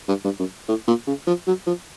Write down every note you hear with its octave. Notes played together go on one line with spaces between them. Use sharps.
G2
G2
F#2
A2
A#2
C#3
F3
F#3
F3